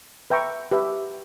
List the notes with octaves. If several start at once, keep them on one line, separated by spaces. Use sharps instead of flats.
B4 E5 G5 A#5 C#6
G4 B4 E5